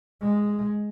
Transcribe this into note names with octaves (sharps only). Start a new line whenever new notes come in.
G#3